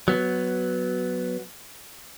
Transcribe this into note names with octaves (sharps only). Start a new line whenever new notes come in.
F#3 B3